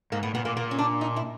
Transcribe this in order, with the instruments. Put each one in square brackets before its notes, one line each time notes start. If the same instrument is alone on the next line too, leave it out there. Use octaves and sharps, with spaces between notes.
[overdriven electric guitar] G#2 [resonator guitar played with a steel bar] A#3
[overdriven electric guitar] A2 [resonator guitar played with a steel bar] B3
[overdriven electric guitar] A#2 [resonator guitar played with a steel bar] B3
[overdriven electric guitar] A#2 [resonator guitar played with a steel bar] A#3
[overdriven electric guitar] A#2 [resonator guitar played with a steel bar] A#3
[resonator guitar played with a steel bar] C#4
D4
D#4
E4